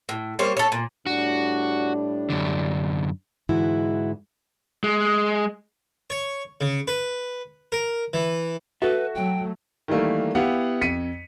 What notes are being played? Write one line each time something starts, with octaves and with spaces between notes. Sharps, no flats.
A2
G3 A#3 C5 C#5
A4 C#5
A#2
A2 G3 D4 F#4
F#2 D3
G#2 D3 E3 G#3 E4 F#4
G#3
C#5
C#3
B4
A#4
E3
F#4 A4 B4 E5
F#3 A3 G5
D#3 E3 G3 A3 A#3
B3 E4 G4 F5 F#5
F2 B6 C#7 D#7